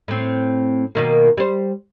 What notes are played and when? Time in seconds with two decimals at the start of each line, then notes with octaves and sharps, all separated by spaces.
0.08 A2 C4
0.95 B2 D#3 A#3
1.37 G3 C5